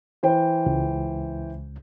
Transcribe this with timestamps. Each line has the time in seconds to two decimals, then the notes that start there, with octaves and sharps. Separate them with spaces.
0.23 E3 C5 G5
0.66 C#2